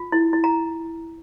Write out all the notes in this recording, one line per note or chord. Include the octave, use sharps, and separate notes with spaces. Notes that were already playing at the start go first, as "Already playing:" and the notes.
Already playing: F4
E4
E4
A#5